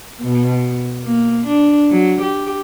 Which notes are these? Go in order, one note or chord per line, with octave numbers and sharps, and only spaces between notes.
B2
A#3
D4
F#3
G4